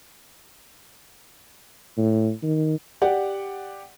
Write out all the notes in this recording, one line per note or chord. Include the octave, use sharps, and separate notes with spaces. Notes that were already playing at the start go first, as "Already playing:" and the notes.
A2
D#3
G4 D5 F#5